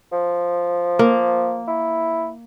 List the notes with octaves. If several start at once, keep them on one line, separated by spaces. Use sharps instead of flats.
F3
A#3
E4